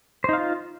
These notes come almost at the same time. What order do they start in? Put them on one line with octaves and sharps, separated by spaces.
C5 D#4 F5 F4